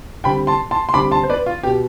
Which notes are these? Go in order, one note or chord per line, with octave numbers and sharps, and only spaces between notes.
D3 G3 C4 G5 B5
A5 C6
A5 C6
C6
D3 G3 C4 B5 D6
A5 C6
C5
B4 D5
F4
B2 B3 G4